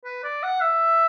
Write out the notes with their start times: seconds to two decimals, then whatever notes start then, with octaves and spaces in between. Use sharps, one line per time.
0.05 B4
0.24 D5
0.43 F#5
0.61 E5